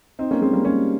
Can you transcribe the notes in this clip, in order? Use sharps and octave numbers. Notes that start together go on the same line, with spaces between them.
C4 D#4
A#3 C#4
G#3 C4
G3 A#3
A#3 C#4